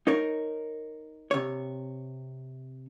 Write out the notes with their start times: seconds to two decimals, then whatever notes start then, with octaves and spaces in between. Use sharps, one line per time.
0.07 D#4 A#4 C#5
1.31 C3 C#5